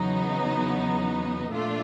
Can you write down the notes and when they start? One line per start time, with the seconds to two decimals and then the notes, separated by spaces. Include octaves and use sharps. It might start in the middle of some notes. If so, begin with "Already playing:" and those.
Already playing: E2 C#3 F#3 B3 D#4
1.48 A#2 F3 A3 D4 F4